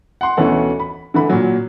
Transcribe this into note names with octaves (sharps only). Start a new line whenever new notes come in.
F#5 C6
D2 B2 E3 C#4 A4 F#5
B5
D3 E3 B5
A#2 F#3